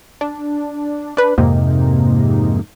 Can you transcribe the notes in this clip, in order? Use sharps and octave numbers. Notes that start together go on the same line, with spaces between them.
D4
D4 B4
F2 G#2 C3 A#3 D#4